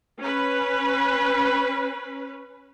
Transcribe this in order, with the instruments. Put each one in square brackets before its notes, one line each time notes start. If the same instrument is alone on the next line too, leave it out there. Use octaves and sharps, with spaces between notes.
[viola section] C#4 B4